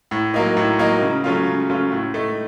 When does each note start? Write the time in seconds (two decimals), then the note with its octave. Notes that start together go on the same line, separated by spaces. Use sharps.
0.11 A2
0.34 F#3 A#3 D#4
0.57 A2
0.79 F#3 A#3 D#4
1.02 C#3
1.24 F#3 A3 C#4 F4
1.47 C#3
1.69 F#3 A3 C#4 F4
1.92 A2
2.14 A3 D#4